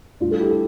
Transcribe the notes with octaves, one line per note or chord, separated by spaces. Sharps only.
A2 G3 D4 F4
A4
E4 G4
A4